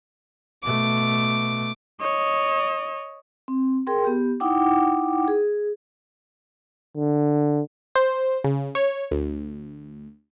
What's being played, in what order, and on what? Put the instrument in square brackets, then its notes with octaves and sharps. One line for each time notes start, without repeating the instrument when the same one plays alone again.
[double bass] B2 A3 [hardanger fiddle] D6
[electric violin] C#5 D#5
[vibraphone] C4
G#4 A#4 G5 C6
B3 G4
D#4 E4 F#5 G5 D6
G#4
[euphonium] D3
[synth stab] C5
C#3
C#5
D2